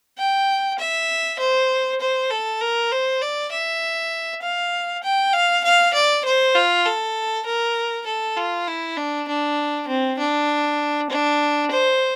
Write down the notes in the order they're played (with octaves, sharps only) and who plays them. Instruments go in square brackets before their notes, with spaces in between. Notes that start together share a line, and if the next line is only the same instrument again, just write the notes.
[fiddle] G5
E5
C5
C5
A4
A#4
C5
D5
E5
F5
G5
F5
F5
D5
C5
F4
A4
A#4
A4
F4
E4
D4
D4
C4
D4
D4
C5